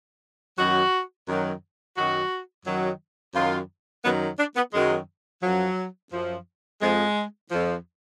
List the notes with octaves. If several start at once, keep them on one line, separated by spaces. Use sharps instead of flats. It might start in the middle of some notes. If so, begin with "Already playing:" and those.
F#2 D#3 F#3 F#4
F#2 D#3 F#3
F#2 D#3 F#3 F#4
F#2 D#3 F#3
F#2 D#3 F#3 F4
F#2 D#3 F#3 B3
D4
B3
F#2 D#3 F#3 G#3
F#2 F3 F#3
F#2 F3
F2 F3 G#3
F2 F3